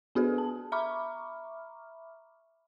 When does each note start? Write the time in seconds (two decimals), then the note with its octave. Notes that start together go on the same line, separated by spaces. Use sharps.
0.15 B3 D4 F#4 G#4 A4 B4
0.38 A5
0.72 E5 A#5 B5 C#6 D6 F6